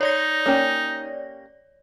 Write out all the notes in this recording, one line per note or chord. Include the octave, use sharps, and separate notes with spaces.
D#4 C#5 D5 A#6
A#3 C#4 G4